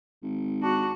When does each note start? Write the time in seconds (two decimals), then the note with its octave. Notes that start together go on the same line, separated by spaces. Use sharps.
0.22 G#1
0.62 D4 F#4